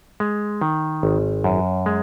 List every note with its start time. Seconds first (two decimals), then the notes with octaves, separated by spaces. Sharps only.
0.20 G#3
0.61 D#3
1.03 G#1
1.44 F#2
1.86 G#3